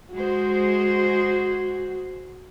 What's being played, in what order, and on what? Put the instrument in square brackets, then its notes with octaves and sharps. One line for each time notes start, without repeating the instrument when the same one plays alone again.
[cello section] G#3 G#4 C5 [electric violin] F#4